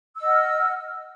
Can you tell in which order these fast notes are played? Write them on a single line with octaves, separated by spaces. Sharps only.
E6 D#5 F#5 F6